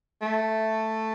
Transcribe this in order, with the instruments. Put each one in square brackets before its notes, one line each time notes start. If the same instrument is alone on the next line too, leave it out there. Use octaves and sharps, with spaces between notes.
[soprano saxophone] A3